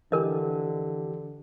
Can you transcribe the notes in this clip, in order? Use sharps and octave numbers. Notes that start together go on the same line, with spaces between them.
D3 E3 D4 G4 A#4 D#5